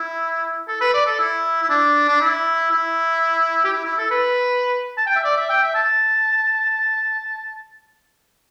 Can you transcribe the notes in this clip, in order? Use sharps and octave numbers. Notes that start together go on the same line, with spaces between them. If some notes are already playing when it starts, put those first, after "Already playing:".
Already playing: E4
A4
B4
D5
A4
E4
E4
D4
D4
E4
E4
G4
E4
E4
A4
B4
A5
G5
E5
D5
E5
G5
E5
A5